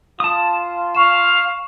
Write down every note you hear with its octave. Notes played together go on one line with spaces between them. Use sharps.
F4 A5 D#6
F5 C#6 E7